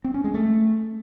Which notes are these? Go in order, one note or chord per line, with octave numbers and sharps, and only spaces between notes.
C4
C#4
G#3
A3